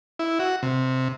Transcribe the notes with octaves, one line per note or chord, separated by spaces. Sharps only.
E4
F#4
C3